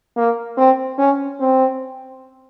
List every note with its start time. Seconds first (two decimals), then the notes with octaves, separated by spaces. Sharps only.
0.17 A#3
0.57 C4
0.98 C#4
1.40 C4